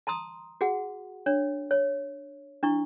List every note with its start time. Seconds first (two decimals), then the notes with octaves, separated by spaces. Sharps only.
0.07 A5 A#5 C6 D#6
0.61 F#4 G#4 F#5
1.26 D4 C#5
1.71 C#5
2.63 D4 E4 C#6